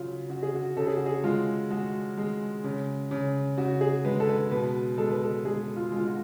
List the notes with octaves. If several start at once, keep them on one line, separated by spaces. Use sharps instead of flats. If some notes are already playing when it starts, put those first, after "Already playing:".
Already playing: C#3 F#3 F4
C#3 F#4
G#4
F#4
C#3 A4
G#4
F#4
G#4
G#3 F4
G#3 F#4
G#3
C#3
C#3
C#3 F#4
G#4
G#3 B4
A4
B4
B2 B4
G#3 A4
B4
A4
G#3 G#4
F4
G#3 F4
F#4